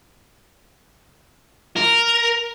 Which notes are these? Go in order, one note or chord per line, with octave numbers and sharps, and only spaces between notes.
A#4